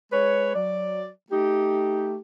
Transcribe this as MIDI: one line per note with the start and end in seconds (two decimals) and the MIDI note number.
0.13 0.52 56
0.13 0.52 71
0.13 0.52 73
0.54 1.08 54
0.54 1.08 74
1.31 2.16 57
1.31 2.16 63
1.31 2.16 67